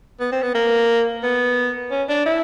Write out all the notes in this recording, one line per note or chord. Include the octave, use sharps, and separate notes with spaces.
B3
C4
B3
A#3
B3
C#4
D4
E4